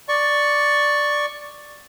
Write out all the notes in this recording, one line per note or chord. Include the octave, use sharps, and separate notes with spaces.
D5 C#6